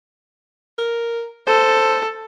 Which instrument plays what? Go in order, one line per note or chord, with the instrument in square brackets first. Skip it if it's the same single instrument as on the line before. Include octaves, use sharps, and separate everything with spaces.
[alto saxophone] A#4
[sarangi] A4 [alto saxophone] C5